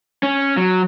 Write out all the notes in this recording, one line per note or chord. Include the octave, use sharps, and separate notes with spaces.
C#4
F#3